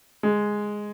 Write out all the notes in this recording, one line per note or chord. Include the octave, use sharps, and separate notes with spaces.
G#3